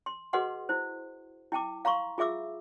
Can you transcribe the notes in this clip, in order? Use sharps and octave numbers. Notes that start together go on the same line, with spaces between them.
C6
F#4 G#4 B4 D#5 F#5 C6
E4 C5
E4 G5 A5 D6
F5 A#5 C6 C#6
F4 G#4 E5 D6 E6